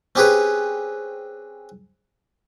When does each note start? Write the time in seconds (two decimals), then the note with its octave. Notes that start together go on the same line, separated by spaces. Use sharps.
0.15 C4 C#4 G4 G#4 B4 C#5